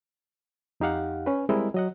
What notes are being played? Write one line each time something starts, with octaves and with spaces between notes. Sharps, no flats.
F2 D#4 G4 F5 F#5
C#4 B4
G3 G#3 C4 E4 A#4 D#5
F#3 D#5 F#5